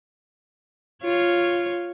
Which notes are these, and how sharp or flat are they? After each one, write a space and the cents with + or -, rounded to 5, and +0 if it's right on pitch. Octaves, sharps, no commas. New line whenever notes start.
F4 +0 C#5 +0